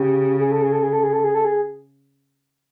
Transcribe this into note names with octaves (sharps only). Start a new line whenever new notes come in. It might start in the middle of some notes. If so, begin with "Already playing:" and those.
Already playing: C#3 G4
G#4
A4
G#4
A4
G#4
A4
G#4
A4
G#4
A4
G#4